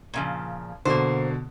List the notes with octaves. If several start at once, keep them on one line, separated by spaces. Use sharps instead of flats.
A#2 C#3 F3
B2 D3 A#3 C5